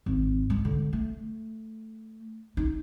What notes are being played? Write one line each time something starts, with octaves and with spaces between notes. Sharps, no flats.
G#1
G#3
D3
A3
D#4